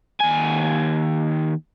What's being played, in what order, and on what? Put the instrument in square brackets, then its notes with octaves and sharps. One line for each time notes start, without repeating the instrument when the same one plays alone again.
[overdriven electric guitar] D#2 G#5